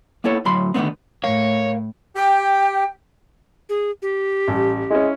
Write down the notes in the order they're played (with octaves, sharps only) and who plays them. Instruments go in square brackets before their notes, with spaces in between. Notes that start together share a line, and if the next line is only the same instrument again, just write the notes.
[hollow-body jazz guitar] A#3 B3 E4 A4 C#5
D2 A2 F#3 B5 C6
D3 D#3 F3 A3 B3 C4
[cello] A2 [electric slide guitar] A#4 F5 [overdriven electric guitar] C#5
[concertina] G4 [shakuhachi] G5
[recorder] G#4
G4
[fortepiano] A1 G3
[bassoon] G#3 [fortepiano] C#4 E4